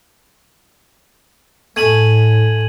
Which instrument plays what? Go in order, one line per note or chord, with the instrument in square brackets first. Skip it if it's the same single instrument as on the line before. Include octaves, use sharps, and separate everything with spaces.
[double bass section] A2 [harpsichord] A3 G#4 G#5 [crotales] G#6 D#7 F#7